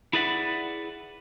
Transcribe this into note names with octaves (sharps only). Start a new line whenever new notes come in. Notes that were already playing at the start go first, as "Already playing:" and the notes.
E4 G#4 B4 D5 E5 F#5